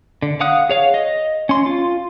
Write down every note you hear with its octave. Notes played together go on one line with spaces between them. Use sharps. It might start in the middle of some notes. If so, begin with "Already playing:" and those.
D3
F5 F#5 D#6 F#6
G#4 C#5 F5
D#5
C#4 C6
F4